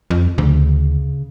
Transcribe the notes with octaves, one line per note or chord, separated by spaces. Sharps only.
F2
D2 C#3